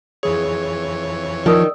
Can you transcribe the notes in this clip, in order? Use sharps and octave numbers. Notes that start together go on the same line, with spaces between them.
F2 E3 G#4 C#5
D#3 F3 D5 D#6 E6